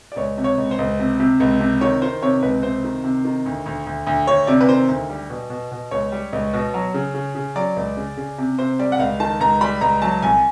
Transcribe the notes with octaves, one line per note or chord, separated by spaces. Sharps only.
D5
C#2 C#5
C3
C#5
C#2
C5
C#2
C3
C3
C#2
C3
D#3 C#5
D#3 C5
C3 C#5
C#2 B4
C3 C5
D#3
C3
D#3
D2
D2
D2
D2
D2 C#5
C3 D5
B4
D#3 C5
D2
G3
B2
B2
B2
C#2 C#5
G3
C#2
B2
F#3
C#3
C#3
C#3
F#3 D5
C#2
C#3
C#3
C3
C3 C5
G3 D5
F#5
C#2 F5
D#3 A5
C#2 A#5
G3 B5
C#2 A#5
F#3 A5
C2 G#5